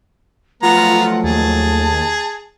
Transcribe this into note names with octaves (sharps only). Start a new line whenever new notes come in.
F3 F#3 A3 B3 F4 F#5 A#5
D#2 G#4 A5